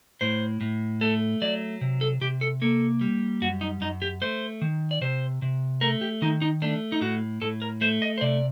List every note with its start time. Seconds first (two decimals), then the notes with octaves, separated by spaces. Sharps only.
0.21 A2 C5
0.61 A2
1.01 A3 A4
1.42 F#3 D5
1.81 C3
2.01 A4
2.21 C3 G4
2.41 A4
2.62 A#3 A4
3.01 G3
3.42 F#2 F#4
3.61 D#4
3.81 F#2 D#4
4.02 G4
4.22 A3 C5
4.62 D#3
4.91 D5
5.01 C3 C5
5.42 C3
5.81 A3 A#4
6.01 G4
6.22 D#3 D#4
6.42 D#4
6.62 A3 D4
6.92 D#4
7.01 A2 F#4
7.42 A2 A4
7.62 A#4
7.81 A3 C5
8.02 D#5
8.18 C5
8.21 C3 D5